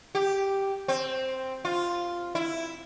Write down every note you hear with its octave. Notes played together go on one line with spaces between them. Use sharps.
G4
C4
F4
E4